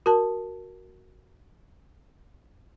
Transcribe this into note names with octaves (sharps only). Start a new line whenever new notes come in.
F#4 A#4 A5